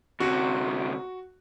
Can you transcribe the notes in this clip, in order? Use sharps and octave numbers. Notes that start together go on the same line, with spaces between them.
D2 C3 F#4